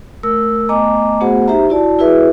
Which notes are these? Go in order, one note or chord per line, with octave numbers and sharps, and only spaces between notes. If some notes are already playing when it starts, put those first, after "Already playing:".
A3 A#4 E6
A3 B3 D#5 G#5 A#5 D6
A3 B3 F#4 G#4 C5 F#5
D#4 G4 C5 E5 A#5
E4 F#4 D5 A5
E4 F#4 G#4 B4 E5